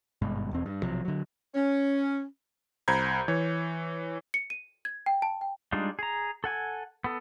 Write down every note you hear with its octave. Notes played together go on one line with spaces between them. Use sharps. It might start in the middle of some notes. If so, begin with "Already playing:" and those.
G#1 G2 B2 G#3
E1 E2 C4
G2
B1 C3 F3 F#3
D3 F#3
C#4
C2 C5 A#5 B5 G6 G#6
E3 C#5
C#7
D#7
G#6
G5
A5
G5
G3 G#3 D4 D#4 F4
G#4 A#5
A4 F#5 G#5
B3 A4